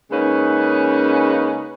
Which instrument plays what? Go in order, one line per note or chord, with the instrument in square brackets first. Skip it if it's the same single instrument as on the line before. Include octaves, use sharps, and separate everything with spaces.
[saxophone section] C#3 G#3 A#3 C#4 D#4 B4